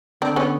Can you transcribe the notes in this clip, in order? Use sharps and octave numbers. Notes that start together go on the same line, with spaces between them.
D3 C4 D4
B3 C#4